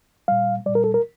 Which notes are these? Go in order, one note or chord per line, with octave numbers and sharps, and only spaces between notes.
A#2 G3 F5
A#2 G3 D5
A#4
A4
A#4